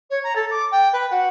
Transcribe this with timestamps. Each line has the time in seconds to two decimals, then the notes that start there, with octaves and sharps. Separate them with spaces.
0.10 C#5
0.23 A#5
0.35 A4
0.50 D6
0.71 G5
0.93 B4
1.10 F#4